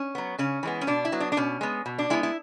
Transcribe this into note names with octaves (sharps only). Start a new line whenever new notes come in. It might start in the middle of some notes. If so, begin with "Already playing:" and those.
Already playing: C#4
F#3 B3
C#3 C#4
E3 G#3 B3
C#4
B2 D4
E4
F#3 B3
D4
D4
B2 C#4
G#3 B3
B2
D4
G#3 B3 E4
E4